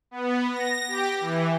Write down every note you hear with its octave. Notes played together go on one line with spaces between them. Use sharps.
B3
A#6
G4
E3